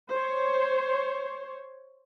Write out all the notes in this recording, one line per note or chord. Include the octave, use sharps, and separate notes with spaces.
C5 C#5